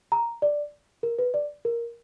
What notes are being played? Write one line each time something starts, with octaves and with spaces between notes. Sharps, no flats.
A#5
D5
A#4
B4
D5
A#4